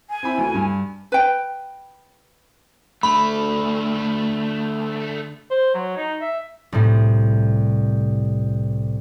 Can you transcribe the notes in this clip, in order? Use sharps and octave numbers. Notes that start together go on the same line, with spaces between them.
G#5
C4 E4 B5
D2 E3
G2
B4 G5
D3 A3 B5
C5
F#3
D#4
E5
C2 A2